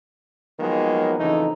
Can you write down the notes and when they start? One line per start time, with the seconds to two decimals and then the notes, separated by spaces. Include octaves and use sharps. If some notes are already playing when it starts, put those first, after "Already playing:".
0.60 D#3 F3 F#3 G#3 A#3 B3
1.19 F2 C#3 E3 A3 D#4